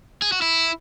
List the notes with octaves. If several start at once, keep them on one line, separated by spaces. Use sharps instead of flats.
G#4
F#4
E4